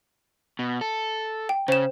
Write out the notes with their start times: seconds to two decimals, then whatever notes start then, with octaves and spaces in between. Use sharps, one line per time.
0.59 B2
0.81 A4
1.49 G5
1.68 C#3 C5 E7